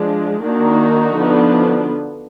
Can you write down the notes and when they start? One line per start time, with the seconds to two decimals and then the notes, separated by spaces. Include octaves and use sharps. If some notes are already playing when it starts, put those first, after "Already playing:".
Already playing: F3 G#3 D4
0.43 D#3 A#3 D4 D#4 F#4
1.15 D3 F3 B3 D4